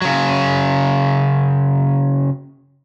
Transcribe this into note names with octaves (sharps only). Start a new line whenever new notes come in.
C#3 F#3